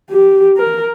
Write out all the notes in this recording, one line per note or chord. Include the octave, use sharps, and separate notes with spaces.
G4
A#4